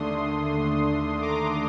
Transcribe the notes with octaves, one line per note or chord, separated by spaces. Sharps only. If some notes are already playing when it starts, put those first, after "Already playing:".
Already playing: D#2 D3 A3 D4 C6 D#6
A#5 D6